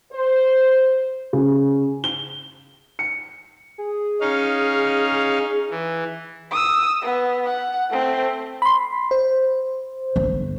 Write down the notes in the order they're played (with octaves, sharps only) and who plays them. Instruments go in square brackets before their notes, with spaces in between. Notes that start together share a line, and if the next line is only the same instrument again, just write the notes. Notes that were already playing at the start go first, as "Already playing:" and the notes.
[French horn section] C5
[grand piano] C#3
G7
C#7
[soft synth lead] G#4
[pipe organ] C#4 D#4 F5
E3
[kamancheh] D#6 E6
B3
F#5
A3 C4
[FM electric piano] B5 C6
C5
[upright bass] G1